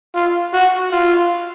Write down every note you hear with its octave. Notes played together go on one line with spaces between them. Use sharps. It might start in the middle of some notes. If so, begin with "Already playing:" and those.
F4
F#4
F4